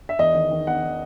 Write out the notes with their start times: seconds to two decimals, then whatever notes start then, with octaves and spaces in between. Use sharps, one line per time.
0.09 E5
0.19 E2 D#5
0.34 D#3
0.51 D#3
0.67 B3 F#5
0.83 D#3